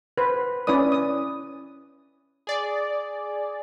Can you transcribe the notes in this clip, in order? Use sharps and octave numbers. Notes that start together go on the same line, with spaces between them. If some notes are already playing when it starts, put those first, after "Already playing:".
B4 C5
C#4 E4 B4 D5 D#6
D#6
G#4 D5